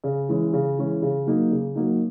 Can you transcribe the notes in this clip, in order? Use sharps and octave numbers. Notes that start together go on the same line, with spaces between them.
C#3
E3 G#3 C#4
C#3
E3 G#3 C#4
C#3
F#3 A#3 D#4
C#3
F#3 A#3 D#4